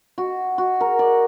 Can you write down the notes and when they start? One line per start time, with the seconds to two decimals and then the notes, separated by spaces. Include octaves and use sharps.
0.18 F#4
0.58 F#4
0.81 A#4
0.99 D5